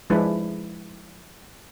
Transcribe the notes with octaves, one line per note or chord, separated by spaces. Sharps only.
F3 G#3 D4 E4 B4